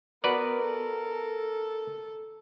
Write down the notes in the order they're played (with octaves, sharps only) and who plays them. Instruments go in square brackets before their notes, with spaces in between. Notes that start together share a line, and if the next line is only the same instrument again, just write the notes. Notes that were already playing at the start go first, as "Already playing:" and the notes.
[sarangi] B3 [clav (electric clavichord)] F#4 B4 D5 [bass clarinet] A#4
[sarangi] A4